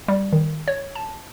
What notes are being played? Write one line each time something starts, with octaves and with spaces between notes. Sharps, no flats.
G3
D#3
C#5
A5